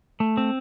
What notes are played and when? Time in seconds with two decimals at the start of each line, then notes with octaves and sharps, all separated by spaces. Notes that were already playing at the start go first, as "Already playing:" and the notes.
0.20 A3
0.37 C4